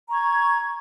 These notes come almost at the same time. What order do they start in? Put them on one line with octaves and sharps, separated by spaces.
A#5 C#6 G#6